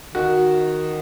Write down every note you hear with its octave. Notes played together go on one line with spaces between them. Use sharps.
D#3 F#4